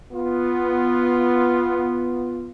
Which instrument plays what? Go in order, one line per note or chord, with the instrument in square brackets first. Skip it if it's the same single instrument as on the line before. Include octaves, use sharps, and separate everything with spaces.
[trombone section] B3 F4